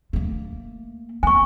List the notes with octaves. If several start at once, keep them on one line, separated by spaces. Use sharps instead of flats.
A3 A#3
B3 G#5 C#6